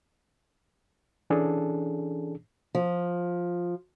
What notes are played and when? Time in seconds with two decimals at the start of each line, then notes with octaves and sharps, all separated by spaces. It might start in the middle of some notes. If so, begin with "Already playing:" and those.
1.30 E3 C#4 D4 G#4 A4
2.75 F3